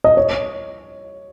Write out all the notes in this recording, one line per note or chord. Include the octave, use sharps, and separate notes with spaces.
D#5
C#5